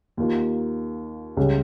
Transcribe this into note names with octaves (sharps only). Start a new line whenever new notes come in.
D#2 D#3 A#3 F4
C#2 C#3 G3